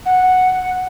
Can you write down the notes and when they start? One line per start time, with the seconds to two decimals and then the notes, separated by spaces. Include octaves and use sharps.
0.06 F#5